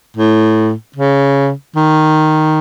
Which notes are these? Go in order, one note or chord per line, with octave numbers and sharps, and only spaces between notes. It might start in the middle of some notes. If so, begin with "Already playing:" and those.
A2
C#3
D#3